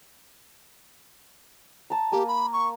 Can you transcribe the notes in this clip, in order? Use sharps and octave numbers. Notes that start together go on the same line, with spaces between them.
A5 A#5
A#3 G4 G#5 A#5
B5
C#6